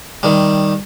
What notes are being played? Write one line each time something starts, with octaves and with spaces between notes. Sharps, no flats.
D#3 G3